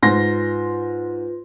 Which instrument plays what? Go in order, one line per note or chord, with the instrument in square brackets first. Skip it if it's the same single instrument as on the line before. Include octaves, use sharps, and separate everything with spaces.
[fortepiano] G#2 [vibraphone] F4 B4 [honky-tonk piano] C6 A#6